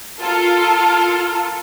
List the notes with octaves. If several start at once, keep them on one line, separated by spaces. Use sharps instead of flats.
F4 A4 A#4